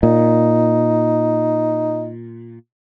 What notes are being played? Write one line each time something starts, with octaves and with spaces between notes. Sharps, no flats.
A#2 D#4